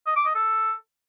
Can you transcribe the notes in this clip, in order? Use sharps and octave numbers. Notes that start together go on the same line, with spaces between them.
D#5
D6
D#5
A4